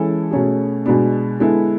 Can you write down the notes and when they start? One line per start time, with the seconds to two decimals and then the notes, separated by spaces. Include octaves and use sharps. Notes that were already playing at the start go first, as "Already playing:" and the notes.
Already playing: E3 G#3 C#4 E4 A4
0.31 B2 A3 C#4 G#4
0.86 B2 G#3 B3 D4
1.40 D3 G#3 B3 E4 A4